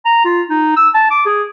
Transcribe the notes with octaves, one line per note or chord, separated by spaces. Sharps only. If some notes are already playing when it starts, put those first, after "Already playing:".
A#5
F4
D#4
E6
A5
D6
G#4